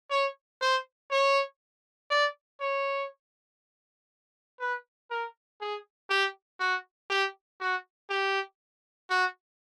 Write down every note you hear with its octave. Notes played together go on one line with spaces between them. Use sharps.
C#5
C5
C#5
D5
C#5
B4
A#4
G#4
G4
F#4
G4
F#4
G4
F#4